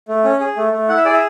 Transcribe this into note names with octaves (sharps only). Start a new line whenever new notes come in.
A3
C#4
G#4
A3
A3
E4 F#5
E5
G#4 D5
E5